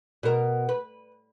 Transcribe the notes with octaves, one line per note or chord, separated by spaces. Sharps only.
B2 A#4
B4